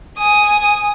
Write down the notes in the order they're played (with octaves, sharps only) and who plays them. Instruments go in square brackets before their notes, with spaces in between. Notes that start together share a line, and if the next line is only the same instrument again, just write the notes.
[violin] G#5 D#6